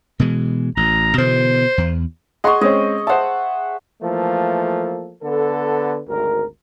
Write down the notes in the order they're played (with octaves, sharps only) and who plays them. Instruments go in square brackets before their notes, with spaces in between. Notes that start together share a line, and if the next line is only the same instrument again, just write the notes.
[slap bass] B2 E3 G#3
[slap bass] A1 [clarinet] A#5
[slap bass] B2 D3 E3 [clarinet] C5
[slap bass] E2
[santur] G#4 C#6 [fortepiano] D#5 F#5 C6
[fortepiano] G#3 C4 C#4 [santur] D#5
[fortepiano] C5 A5 [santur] E5 F#5
[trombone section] E3 F3 A3 A#3 A4
D3 B3 A4
G#1 D2 A#4